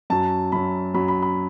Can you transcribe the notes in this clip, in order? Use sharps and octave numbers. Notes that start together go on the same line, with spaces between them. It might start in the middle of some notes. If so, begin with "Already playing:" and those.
F#2 F#3 A5
F#2 F#3 B5
F#2 F#3 B5
B5
B5